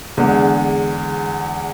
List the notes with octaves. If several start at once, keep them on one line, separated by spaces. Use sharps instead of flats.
E2 D3 G#3